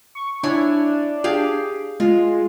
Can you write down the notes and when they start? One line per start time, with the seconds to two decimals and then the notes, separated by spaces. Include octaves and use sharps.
0.15 C#6
0.43 D4 E4 C#5 G#5
1.24 G4 G#4 F5
2.00 G#3 F4